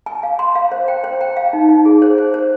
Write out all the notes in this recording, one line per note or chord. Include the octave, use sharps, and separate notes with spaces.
G#5
F5
C6
F5
C5
G5
C5
G5
F5
D#4
D#4
G#4
C5
C5
C5